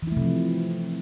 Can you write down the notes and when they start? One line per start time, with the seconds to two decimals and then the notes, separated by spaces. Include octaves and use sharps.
0.03 E3
0.07 E4
0.12 A3
0.17 C3
0.21 F3